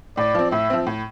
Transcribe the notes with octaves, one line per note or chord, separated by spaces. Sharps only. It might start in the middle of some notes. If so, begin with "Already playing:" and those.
A2 D5
F3 C4
A2 E5
F3 C4
A2